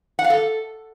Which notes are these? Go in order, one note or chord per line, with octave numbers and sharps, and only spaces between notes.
F#5
F5
A4